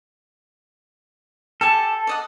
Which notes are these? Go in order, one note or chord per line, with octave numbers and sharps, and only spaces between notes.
G4 A4 G#5 A5
D5 D#5 F#5